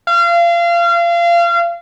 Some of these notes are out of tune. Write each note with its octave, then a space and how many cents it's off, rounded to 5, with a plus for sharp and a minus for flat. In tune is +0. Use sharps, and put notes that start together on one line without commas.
F5 -30